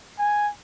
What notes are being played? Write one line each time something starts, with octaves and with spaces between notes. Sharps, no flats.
G#5